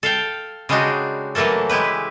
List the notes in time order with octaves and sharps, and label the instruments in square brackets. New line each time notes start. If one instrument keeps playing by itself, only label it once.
[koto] A4 F5 G5
C#3 G3 G#3 D4 D#4 F#4
E3 F#3 A3 A#3 A4
G#3 E4 G4 B4